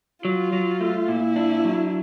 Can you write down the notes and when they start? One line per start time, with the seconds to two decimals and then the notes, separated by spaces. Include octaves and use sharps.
0.25 F#3 F4
0.53 F#3
0.81 A3
1.08 A#2 E4
1.36 D4
1.64 F#3